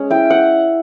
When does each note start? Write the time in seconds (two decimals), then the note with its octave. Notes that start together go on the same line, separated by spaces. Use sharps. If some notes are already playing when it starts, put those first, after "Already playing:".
Already playing: G#3 C#4
0.10 E4 G5
0.30 F#5